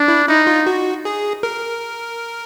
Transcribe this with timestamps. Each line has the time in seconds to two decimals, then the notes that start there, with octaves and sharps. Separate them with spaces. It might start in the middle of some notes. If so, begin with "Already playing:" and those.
Already playing: D4
0.08 E4
0.28 D#4 E4
0.47 F4
0.67 F#4
1.05 G#4
1.43 A#4